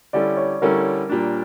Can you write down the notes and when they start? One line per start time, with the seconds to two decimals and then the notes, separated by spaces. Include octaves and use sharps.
0.13 D3 G3 C#4 E4 A4 D5
0.37 C#5
0.62 D3 G3 C#4 E4 A4 A#4
1.09 A#2 G3 D4